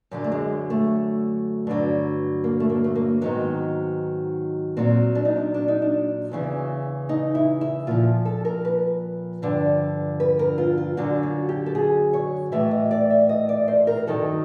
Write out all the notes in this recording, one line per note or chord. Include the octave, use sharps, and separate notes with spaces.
F#2 D3 F#3
A3
G#3
A3
G2 D3 F#3
A#3
A3
A#3
A3
A#3
G#2 D#3 F#3 B3
A#2 F#3 C4
D4
D#4
D4
D4
D#4
D4
E2 C#3 E3
D#4
E4
E4
A#2 F3 F4
A4
A#4
B4
G2 D3 F3
B4
A#4
F4
F4
F#2 D3 F#3 F#4
F4
G4
A4
G#4
C#5
A2 E3 E5
D#5
D5
E5
D#5
D5
C5
A#4
G2 D#3 F#3 A4